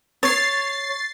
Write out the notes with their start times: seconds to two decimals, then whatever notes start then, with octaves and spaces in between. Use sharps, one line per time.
0.23 C#5 A6 C7